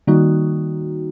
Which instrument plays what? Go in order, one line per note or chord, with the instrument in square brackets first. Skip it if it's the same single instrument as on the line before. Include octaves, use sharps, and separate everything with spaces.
[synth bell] D#3 G3 A#3 D#4 F#4